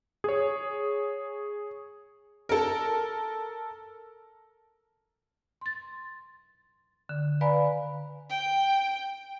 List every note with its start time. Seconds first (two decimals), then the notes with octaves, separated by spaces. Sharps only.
0.24 G#4 C#5
2.49 A4 A#4
5.61 C6 A6
7.09 D3
7.41 B4 D5 F5 G#5 A#5 B5
8.30 G5